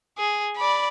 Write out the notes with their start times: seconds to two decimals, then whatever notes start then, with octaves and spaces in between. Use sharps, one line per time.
0.18 G#4
0.57 D5 B5